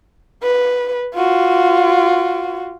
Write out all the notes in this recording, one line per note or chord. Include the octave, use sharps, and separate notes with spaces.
B4
F4 F#4